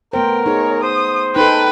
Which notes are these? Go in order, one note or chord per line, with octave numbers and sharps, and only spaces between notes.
A3 B3 A#4 C5 G5
D#4 G#4 C#5
C5 D#6
D#4 A4 B4 G5